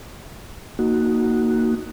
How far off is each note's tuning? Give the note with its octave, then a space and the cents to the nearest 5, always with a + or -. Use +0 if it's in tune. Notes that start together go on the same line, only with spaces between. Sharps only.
A#3 +0 D#4 +0 F#4 +0